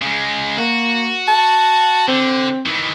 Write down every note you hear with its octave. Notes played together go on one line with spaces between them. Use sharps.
C#3 G#3
A#3 F#4
A5
D3 C4
D#3 E3